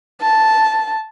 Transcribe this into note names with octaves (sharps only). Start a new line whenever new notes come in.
A5